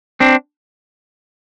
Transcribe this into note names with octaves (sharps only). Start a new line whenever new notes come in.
C4 D4